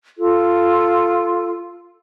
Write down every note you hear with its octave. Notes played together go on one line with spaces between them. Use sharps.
F4 A4